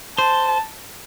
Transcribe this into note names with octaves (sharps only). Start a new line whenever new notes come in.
C5 A5